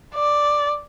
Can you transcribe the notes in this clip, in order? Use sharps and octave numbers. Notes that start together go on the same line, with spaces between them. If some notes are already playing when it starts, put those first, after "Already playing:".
D5